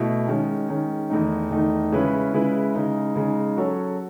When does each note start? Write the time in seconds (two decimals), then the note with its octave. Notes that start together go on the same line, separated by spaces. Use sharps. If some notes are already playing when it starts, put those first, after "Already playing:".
Already playing: B2 A3 E4
0.27 D#3 G#3 C#4
0.69 D#3 G#3 C#4
1.10 E2 D#3 A3 D#4
1.51 E2 D#3 A3 D#4
1.92 C#3 G#3 C#4 E4 B4
2.33 C#3 G#3 C#4 E4 B4
2.75 C#3 G#3 D#4
3.16 C#3 G#3 D#4
3.57 F#3 C#4 F#4 A4 C#5